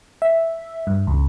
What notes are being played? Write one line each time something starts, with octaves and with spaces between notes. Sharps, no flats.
E5
G2
C#2